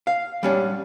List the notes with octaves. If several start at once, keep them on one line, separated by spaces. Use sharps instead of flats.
F5
G3 C#4 D4